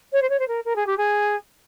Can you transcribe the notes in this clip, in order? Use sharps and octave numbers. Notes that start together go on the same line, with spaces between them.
C#5
C5
C#5
C5
A#4
A#4
G#4
G4
G#4